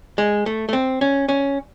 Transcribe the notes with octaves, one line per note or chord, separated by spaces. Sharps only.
G#3
A3
A3
C4
C#4
C#4